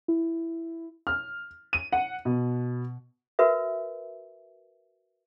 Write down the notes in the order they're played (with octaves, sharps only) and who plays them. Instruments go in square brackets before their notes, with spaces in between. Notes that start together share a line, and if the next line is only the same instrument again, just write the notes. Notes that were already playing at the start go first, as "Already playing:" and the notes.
[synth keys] E4
[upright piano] F6
D#7
F#5
B2
[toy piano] F#4 A#4 B4 E5